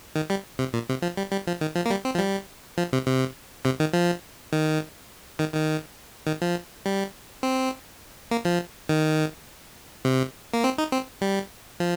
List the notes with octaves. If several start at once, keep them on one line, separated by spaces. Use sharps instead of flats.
D#3
G3
C3
A#2
C3
F3
G3
G3
F3
D#3
F3
A#3
G3
C4
F3
G3
F3
C3
C3
C3
D#3
F3
D#3
D#3
D#3
D#3
F3
G3
C4
A#3
F3
D#3
C3
A#3
C4
D#4
C4
G3
F3